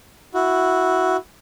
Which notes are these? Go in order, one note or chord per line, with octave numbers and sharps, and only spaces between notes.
E4 F#4